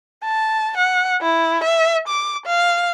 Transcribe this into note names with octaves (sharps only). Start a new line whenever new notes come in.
A5
F#5
E4
E5
D6
F5